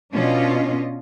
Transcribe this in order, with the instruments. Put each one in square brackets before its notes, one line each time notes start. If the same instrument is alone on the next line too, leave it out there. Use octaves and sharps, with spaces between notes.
[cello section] B2 C#4 D4 F4 D#5